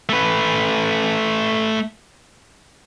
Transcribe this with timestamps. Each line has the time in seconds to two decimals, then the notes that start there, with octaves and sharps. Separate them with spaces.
0.09 A3 B4